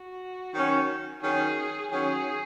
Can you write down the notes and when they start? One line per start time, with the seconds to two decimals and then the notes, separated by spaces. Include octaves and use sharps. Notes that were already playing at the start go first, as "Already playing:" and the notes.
Already playing: F#4
0.53 D#3 F#3 C#4
1.22 D#3 F#3 C#4 G#4
1.91 D#3 F#3 C#4 G#4